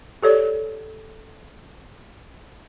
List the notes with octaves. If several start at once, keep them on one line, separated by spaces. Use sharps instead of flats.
G4 A4 C#5 D5